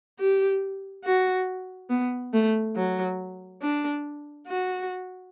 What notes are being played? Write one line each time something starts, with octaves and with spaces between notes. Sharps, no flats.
G4
F#4
B3
A3
F#3
D4
F#4